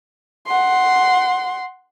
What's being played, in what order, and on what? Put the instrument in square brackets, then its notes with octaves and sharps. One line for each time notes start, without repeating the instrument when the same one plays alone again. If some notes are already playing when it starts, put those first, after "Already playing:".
[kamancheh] F#5 C6